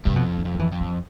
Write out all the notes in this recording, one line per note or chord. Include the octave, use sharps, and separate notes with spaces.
G2 C3
F2 B2
D3
F2
F3
E3
F2
F3